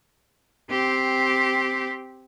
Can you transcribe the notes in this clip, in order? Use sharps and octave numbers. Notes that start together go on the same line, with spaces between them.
C4 G4